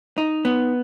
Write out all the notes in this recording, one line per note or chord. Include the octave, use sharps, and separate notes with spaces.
D#4
B3